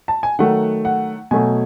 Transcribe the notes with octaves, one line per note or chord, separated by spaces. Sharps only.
A5
G#5
D#3 F#3 A3 F#5
F#5
B2 F#3 A3 G#5